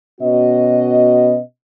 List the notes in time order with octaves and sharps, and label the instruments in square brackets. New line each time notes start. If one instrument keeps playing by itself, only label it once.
[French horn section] B2 B3 C#4 F#4 D#5